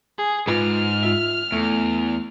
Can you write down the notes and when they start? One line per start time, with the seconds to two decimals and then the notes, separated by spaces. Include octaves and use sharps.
0.18 G#4
0.48 G#2 F4 B4 F6
1.03 F4 E5
1.52 E2 A3